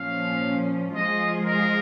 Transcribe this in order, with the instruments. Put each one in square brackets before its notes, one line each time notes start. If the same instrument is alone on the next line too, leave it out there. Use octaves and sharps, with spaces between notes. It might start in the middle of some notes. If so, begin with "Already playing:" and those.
Already playing: [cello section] A#2 F3 C#4 [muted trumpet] F5
[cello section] F3 G#3 F4 G#4 [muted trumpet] D#5
[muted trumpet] A#4